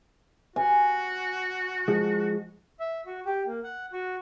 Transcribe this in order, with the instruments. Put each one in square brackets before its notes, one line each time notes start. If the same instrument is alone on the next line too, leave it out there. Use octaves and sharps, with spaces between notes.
[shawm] F#4 [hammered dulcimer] G#5
[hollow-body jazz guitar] F3 G#3
[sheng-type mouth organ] E5
F#4
G4
A#3
F#5
F#4